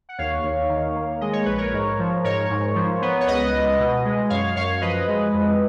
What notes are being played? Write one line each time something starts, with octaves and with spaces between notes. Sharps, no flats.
F#5
D#2 C#5 F5
D#2
D#3
A#3
G#3 D#5
C#5
A#1 B4
A#4 C#5
G#2
F3
G#2 A#4 C#5
G#2
F3
B3
C#5
C#2 B4 D#5
C#2
B2
G#3
F#2 C#5 F5
F#2 C#5 F5
F3 B4 D#5
G#3
F2